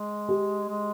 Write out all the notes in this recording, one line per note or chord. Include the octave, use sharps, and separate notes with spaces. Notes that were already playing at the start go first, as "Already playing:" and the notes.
Already playing: G#3
G4
G#3